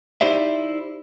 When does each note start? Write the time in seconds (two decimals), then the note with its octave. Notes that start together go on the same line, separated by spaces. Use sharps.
0.21 D#4 E4 G4 C5 D5 E5